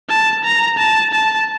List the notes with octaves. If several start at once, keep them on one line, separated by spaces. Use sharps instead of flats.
A5
A#5
A5
A5